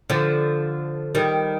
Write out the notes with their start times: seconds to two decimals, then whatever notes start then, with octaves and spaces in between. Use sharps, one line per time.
0.10 D3 F3
1.15 D#3 G3